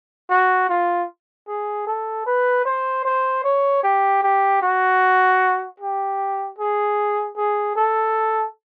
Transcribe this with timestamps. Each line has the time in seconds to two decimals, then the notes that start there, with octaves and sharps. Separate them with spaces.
0.30 F#4
0.69 F4
1.48 G#4
1.87 A4
2.26 B4
2.65 C5
3.05 C5
3.44 C#5
3.83 G4
4.23 G4
4.62 F#4
5.80 G4
6.59 G#4
7.37 G#4
7.76 A4